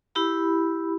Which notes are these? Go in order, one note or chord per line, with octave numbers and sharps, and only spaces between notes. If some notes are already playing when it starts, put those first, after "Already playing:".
E4 G4 B5